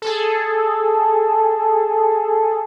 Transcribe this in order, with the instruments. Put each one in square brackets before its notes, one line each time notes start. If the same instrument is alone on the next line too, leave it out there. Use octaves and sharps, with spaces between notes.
[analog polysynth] G#4 A4